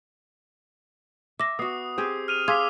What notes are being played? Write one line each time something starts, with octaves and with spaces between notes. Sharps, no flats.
E5 D6 A#6
B3 F#4 D#6 C7
C4 G4 G#4
F6 D#7 F7
G#4 F5 C6 D6 E6 G#6 B6